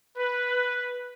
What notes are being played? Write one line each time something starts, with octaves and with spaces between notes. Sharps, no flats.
B4